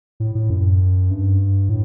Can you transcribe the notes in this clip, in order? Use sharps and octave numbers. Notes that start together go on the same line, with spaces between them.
A2
A2
F#2
G2
A2